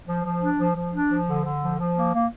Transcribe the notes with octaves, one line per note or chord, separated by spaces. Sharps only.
F3
F3
D4
F3
F3
D4
F3
D3
D3
F3
F3
A#3
A#3